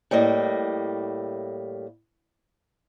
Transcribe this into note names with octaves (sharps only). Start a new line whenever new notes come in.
A2 G3 A#3 D#5